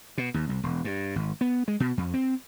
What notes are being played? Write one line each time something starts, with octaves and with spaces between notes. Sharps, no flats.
B2
D#2
C2
E1
G2
G#1
B3
G#3
B2
F2
C4